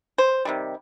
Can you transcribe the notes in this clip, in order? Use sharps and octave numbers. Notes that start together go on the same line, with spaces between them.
C5
C3 D#3 G3